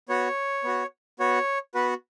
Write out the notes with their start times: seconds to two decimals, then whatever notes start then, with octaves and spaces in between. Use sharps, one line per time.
0.09 B3 F#4 C#5
0.64 B3 F#4
1.19 B3 F#4 C#5
1.74 B3 F#4 B4